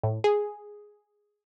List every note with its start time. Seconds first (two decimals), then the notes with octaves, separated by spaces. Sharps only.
0.03 A2
0.24 G#4